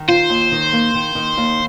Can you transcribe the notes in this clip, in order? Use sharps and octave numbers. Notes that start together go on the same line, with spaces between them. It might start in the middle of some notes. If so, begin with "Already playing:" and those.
Already playing: D#3
F4 C5
D#2
D#3
A#3
D#3
D#3
D#2